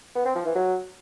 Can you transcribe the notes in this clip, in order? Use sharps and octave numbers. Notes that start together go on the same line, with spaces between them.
B3
C4
F3
E3
F#3